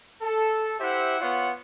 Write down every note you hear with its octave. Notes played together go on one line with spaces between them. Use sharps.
A4
E4 G4 C5 E5 F#5
B3 F4 C#5 F#5